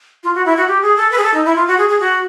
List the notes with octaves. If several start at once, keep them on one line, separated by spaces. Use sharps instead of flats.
F4
F#4
E4
F#4
G4
G#4
A4
B4
G#4
A4
D#4
E4
F4
F#4
G#4
G#4
F#4